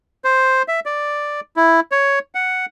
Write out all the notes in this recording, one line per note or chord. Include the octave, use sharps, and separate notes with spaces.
C5
E5
D5
E4
C#5
F#5